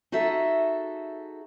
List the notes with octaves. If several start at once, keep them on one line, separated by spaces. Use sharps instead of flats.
D#4 F#4 G#4 A4 E5